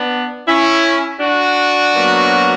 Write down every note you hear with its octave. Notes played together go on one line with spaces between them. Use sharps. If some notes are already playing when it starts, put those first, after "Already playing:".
Already playing: B3 D4
C#4 E4
D4 F#4
B2 F#3 A#3